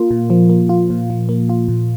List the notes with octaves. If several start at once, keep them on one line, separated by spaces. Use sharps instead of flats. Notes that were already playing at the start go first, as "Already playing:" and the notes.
Already playing: A#3 F4
A#2
F3
A#3
F4
A#2
F3
A#3
F4
A#2